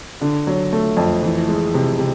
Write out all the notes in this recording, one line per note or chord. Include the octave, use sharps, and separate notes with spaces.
D3
F#3
A3
F2
E3
G#3
C3
C3